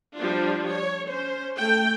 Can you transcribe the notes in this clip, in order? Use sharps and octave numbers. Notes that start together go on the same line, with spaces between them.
F3 G3 D4 F4
C#5
C#4 C5
A3 G5